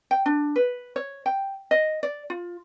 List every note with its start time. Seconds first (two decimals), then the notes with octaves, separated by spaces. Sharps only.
0.11 G5
0.26 D4
0.56 B4
0.96 C#5
1.26 G5
1.71 D#5
2.03 D5
2.30 F4